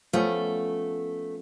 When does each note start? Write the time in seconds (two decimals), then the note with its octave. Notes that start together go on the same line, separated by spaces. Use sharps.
0.13 F3 A3 B3 C#4